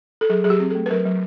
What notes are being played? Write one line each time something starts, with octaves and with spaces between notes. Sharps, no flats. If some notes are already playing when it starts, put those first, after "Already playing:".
A4
F#3 G#4
F#3 G#4
G4
C4
A4
A3
B4
F#3 A#4
F#3